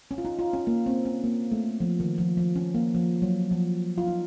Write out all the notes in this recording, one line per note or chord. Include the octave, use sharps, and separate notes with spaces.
C#4
F4
D#4
F4
C#4
A#3
C4
C#4
A#3
A3
F3
D#3
F3
F3
C#4
A#3
F3
F#3
F3
F4
D#4